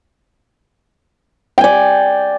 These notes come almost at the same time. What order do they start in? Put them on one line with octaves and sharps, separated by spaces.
G5 G#5 D5